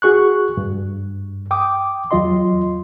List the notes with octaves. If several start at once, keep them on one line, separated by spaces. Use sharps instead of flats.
F#4 G#4 C#6 F#6
G2
G5 D6 D#6
E2 F#3 F4 D#5 C6